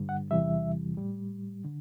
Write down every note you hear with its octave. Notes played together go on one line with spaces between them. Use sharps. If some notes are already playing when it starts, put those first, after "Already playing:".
Already playing: G2 D3 G3
F#5
E2 C3 E3 G3 E5
A2 G3
D3